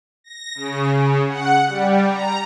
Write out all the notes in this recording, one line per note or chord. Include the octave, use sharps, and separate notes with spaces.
A#6
C#3
C#3
F#5
G3
A#5